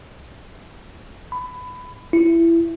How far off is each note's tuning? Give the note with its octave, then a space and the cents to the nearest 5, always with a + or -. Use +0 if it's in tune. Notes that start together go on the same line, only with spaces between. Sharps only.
B5 +20
E4 +20